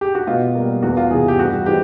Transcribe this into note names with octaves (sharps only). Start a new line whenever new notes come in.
G4
F#4
B2 F4
G3 A#3
E2 F#4
F4
C3 E3 G#4
G4
G2 F#4
E3 G#3 C4 G4